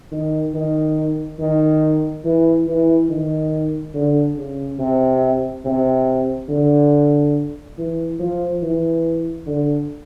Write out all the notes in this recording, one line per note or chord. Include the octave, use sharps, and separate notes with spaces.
D#3
D#3
D#3
E3
E3
D#3
D3
C#3
C3
C3
D3
E3
F3
E3
D3